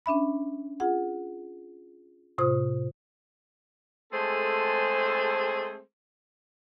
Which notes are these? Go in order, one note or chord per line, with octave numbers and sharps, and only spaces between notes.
C#4 D4 E5 B5
F4 G#4 F#5
A2 C3 F4 C5 D#6
G#3 A3 C4 G#4 A4 C5